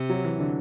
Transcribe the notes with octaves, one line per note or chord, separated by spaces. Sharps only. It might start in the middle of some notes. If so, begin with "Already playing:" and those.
Already playing: C3
F#3
E3
D3